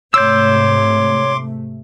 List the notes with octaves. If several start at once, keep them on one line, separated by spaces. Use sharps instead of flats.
G#2 C3 A3 C#5 C6 D6 E6 G6